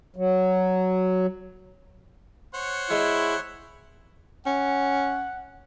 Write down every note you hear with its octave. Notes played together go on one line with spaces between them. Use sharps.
F#3
C5 C#5 F#5
G#3 E4
C#4 F#5